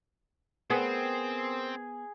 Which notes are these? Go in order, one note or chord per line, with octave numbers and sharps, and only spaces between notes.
B3 C4 G#4 A#4 C5 G5